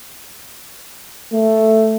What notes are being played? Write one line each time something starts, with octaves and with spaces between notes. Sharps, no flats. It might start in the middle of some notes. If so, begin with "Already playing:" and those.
A3